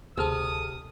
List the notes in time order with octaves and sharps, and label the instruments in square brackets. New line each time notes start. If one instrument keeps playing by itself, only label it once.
[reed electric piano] D2 F6 [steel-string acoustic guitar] C3 [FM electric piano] G#4 A4 [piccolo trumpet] D#6